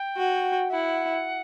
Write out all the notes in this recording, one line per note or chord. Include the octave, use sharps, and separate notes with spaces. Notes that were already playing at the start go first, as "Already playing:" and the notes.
Already playing: G5
F#4
E4 F#5